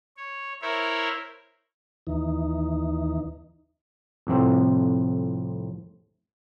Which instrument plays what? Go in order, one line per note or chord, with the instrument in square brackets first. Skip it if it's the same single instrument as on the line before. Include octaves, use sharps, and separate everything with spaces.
[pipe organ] C#5
E4 A#4 C5 C#5 E5
[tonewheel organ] D#2 E3 D#4
[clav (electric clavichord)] C2 F2 A2 C4